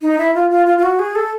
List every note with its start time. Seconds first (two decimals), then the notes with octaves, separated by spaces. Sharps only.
0.02 D#4
0.18 E4
0.35 F4
0.50 F4
0.66 F4
0.78 F4
0.83 F#4
0.99 G#4
1.15 A4